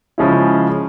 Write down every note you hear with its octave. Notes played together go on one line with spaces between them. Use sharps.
C#3 F3 G#3 C#4 E4